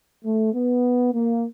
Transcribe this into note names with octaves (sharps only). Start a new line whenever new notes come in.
A3
B3
A#3